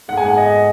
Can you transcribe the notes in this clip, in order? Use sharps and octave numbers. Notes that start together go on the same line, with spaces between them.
G#2 G#3 F#5 G#5
F#5
D#5